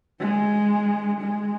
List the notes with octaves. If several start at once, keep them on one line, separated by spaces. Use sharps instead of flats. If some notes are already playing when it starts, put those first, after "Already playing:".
G#3
G#3